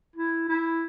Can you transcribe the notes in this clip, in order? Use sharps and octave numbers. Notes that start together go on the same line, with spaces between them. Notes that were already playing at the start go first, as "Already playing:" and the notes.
E4
E4